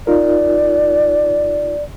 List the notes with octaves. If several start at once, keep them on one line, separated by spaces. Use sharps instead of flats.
D#4 F4 A#4 D5